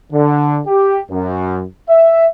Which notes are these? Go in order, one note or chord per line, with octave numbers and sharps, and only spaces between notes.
D3
G4
F#2
E5